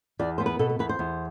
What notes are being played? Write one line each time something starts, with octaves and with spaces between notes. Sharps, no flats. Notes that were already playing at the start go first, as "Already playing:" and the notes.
E2 D5
B3 C5
B4
B2 A4
A4
E2 B4
C5
E2